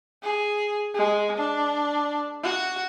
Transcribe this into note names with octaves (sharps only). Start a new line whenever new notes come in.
G#4
G#3
D4
F#4